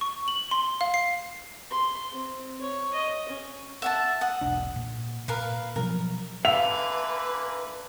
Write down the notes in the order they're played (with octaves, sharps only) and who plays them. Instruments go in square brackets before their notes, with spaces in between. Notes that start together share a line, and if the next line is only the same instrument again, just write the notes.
[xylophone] C#6
F#7
C6
F5
C7
[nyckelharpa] C6
C4
C#5
D#5
C#4
[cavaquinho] E5 F#5 A5
F#5 D#6
[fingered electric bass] E1 B1 D4
A#2
[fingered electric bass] A#2 [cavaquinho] A#4 B4 F5
[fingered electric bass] B2 F3 F#3 [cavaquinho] A#4
[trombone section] D3 E3 A#3 [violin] B4 [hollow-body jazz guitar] E5 F5 [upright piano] F7